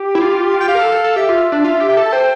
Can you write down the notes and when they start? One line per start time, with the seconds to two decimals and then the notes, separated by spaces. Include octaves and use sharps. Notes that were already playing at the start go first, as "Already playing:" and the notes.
Already playing: G4
0.15 E4
0.20 F4
0.60 G5
0.68 G4 F5
0.75 A#4
0.80 A4
0.92 A4
1.04 A4
1.16 G4 E5
1.29 F4
1.52 D4
1.64 F4 E5
1.80 G4
1.88 E5
1.97 A4
2.06 A5
2.13 C5 G5